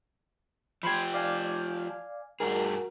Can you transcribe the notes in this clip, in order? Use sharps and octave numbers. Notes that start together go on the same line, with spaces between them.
F3 G4 B5 C6 G#6
D5 F5 G#5
G2 F#4 G#4 A#4